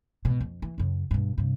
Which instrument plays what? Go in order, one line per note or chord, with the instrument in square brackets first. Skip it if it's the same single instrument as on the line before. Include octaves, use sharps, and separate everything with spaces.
[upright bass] G#2 B2
F2
E3
F#2 C#3
G2 B2
G2 C3